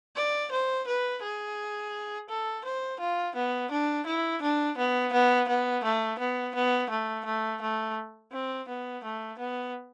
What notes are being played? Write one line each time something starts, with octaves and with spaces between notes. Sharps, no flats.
D5
C5
B4
G#4
A4
C5
F4
B3
D4
E4
D4
B3
B3
B3
A3
B3
B3
A3
A3
A3
C4
B3
A3
B3